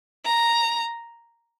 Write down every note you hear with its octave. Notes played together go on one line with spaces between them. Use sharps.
A#5